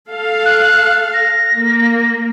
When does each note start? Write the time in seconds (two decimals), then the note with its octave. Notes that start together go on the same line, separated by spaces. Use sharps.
0.11 A4 F5
0.45 F#6
1.14 A#6
1.57 A#3